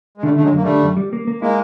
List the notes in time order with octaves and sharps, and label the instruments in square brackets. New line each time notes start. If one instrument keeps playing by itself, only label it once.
[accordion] G#3
[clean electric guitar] D3 [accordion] G3 A3
[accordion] A3
[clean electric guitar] D3 [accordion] F#3 G#3
[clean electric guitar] F#2 [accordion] A#3
[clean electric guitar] D3 [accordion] G3 A3
[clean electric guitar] F#2
G3
A#3
A#3
[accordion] G#3 A#3 [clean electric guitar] E4